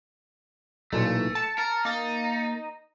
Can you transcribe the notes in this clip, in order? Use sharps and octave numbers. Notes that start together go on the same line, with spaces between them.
B1 A#2 E3 A3
A5 C#7
A#4
A#3 D#4 A6